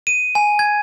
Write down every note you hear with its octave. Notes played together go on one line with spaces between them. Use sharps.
D#7
G#5
G#6